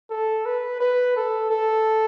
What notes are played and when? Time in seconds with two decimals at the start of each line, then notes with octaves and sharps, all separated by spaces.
0.10 A4
0.46 B4
0.81 B4
1.17 A4
1.51 A4